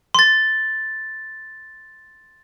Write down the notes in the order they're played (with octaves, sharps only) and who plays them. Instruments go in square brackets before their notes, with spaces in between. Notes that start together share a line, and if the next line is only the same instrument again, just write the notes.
[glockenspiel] C6 A6